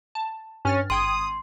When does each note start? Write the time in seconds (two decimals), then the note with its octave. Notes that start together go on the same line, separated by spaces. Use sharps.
0.15 A5
0.65 G2 C#4 F6 A6
0.90 G#1 G5 C6 D#6 G#6